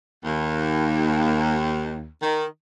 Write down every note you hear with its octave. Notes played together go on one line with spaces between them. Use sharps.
D#2
D#3